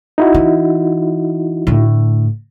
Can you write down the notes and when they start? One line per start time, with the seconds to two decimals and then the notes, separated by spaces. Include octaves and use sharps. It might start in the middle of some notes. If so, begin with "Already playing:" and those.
0.18 D#4 E4 F#4
0.34 E3
1.67 A2 D3